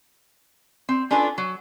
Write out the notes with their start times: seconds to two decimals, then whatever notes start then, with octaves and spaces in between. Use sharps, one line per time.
0.89 C4
1.11 C#4 D4 F4 A4 B4
1.38 F#3